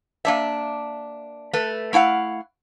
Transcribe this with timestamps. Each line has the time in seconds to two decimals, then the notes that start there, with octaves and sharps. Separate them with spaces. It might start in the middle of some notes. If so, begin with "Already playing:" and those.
0.25 A#3 D4 E5
1.53 A3 B4
1.93 A3 E4 F5 F#5